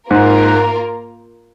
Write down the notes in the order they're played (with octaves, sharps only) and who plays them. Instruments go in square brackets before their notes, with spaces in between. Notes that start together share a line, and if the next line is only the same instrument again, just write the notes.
[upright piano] G#2 [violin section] A#3 F4 A#4